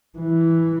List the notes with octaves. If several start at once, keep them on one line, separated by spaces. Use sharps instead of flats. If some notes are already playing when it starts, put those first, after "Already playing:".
E3